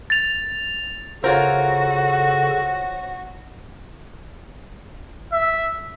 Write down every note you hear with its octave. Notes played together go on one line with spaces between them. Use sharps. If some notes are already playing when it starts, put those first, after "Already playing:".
A6 F7
C#3 F4 F#4 A4 A#4 C5 C#5
E5